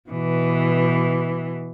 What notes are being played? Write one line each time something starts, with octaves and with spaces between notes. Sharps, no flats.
B2 E3